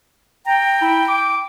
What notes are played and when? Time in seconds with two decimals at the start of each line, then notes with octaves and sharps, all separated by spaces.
0.46 G5 A#5
0.81 E4
1.08 D6